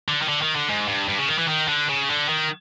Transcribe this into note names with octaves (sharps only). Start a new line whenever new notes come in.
D3
D#3
D3
D#3
D3
G#2
G2
G2
C#3
D#3
E3
D#3
D3
C#3
D3
D#3